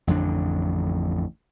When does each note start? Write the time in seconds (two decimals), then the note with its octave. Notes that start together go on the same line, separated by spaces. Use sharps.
0.07 A1 F2 D3 D4